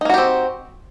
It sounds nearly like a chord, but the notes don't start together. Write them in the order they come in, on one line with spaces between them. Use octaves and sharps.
D#4 A#3 F#4 G4 C4